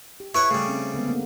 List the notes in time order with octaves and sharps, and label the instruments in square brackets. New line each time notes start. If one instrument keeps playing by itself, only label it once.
[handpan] G4
[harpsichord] E4 B4 C#5 [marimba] C#6
[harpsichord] C#3 G3 [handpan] A3
[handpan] C4 C#4
D3 G#3 B3
A#3